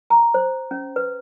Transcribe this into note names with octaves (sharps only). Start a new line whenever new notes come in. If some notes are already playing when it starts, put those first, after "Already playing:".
A#5
C5
C#4
B4